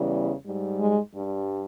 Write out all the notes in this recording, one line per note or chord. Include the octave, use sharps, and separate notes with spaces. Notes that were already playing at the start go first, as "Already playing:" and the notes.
Already playing: E2 C#3 E3 G3
G#2 G3
G#3
G2 G3